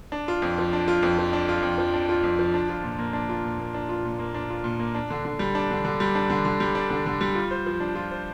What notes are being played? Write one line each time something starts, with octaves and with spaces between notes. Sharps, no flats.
D4
F4
F2
F3
D4
F4
F2
F3
D4
F4
F2
F3
D4
F4
F2
F3
D4
F4
A#2
A#3
D4
F4
A#2
A#3
D4
F4
A#2
A#3
D4
F4
A#2
A#3
D4
D3
D3
G3
D4
D3
D3
G3
D4
D3
D3
G3
D4
D3
D3
G3
F4
C5
F3
D4
F4
C5